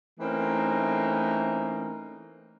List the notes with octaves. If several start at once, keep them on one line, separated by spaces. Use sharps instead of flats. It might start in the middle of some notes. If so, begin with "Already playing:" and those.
E3 A3 A#3 C4 C#4 D#4